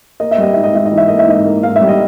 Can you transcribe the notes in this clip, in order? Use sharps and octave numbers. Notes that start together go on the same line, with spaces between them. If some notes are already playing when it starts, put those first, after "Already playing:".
A#3 D#5
E5
G3 D#5
G#2 E5
D#5
G#2 E5
D#5
E3
E5
A#3 D#5
E5
G#2 D#5
A#3
G#2 F5
E5
G3
D#5